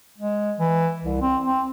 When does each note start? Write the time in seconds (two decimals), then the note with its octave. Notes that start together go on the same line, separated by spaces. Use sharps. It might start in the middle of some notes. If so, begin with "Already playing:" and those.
0.18 G#3
0.59 E3
1.04 C2
1.21 C4
1.44 C4